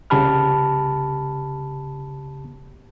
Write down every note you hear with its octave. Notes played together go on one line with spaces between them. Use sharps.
C2 C#3 G4 A5 B5 F6